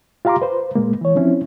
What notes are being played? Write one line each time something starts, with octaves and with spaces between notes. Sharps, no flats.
F4 G4 F5 A#5 C6 D6
B4 C5
A#2 G#3 A#3
E3 C#5
F3 C4 C#4 E4